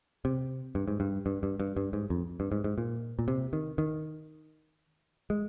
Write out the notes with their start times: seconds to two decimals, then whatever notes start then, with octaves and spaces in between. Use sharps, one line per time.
0.25 C3
0.75 G2
0.88 G#2
1.00 G2
1.26 G2
1.43 G2
1.60 G2
1.77 G2
1.93 G#2
2.10 F2
2.40 G2
2.52 G#2
2.64 G#2
2.78 A#2
3.19 A#2
3.28 C3
3.53 D#3
3.78 D#3
5.30 G#3